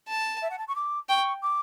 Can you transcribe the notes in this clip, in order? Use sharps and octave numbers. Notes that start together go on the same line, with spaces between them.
A5
E5
F#5
A5
C#6
D6
G5 C#6
D6